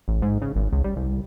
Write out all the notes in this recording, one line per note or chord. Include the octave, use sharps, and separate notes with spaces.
A1
G#2
C#3
G#1
C#2
G3
C2